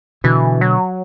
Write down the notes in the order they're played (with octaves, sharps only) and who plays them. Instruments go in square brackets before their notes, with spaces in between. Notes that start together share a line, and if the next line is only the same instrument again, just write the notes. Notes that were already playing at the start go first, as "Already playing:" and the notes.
[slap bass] B2 D3 [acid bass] E3
[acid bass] F#3